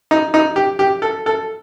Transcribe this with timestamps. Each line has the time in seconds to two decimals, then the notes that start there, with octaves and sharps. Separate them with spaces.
0.11 D#4
0.34 D#4
0.56 G4
0.79 G4
1.02 A4
1.26 A4